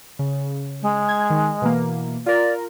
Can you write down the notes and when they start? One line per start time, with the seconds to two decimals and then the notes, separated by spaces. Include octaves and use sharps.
0.19 C#3
0.82 G#3
1.09 G#6
1.30 D#3
1.62 B2 E3 A#3
2.26 F4 A#4 D5